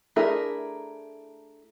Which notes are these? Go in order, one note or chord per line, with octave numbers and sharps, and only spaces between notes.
A3 D4 E4 G#4 A#4